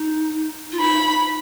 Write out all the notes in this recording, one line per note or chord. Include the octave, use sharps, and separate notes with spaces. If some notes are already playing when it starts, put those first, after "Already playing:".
Already playing: D#4
F4
D#4 B5
D#4